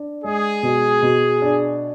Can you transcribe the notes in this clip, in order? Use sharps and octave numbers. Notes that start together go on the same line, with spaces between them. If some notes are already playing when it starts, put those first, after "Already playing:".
Already playing: D4
G#3 G#4
B2
B2
D4